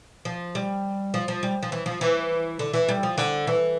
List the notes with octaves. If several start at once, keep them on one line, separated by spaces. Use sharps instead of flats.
F3
G3
F3
F3
G3
F3
E3
F3
E3
D3
E3
G3
F3
D3
E3